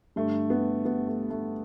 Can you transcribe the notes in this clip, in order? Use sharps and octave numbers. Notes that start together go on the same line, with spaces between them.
G2 D3 A3
B3
B3
A3
A3